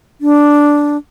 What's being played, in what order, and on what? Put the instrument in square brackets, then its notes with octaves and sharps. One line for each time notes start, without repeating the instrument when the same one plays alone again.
[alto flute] D4